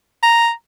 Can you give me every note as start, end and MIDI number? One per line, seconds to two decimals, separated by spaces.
0.22 0.50 82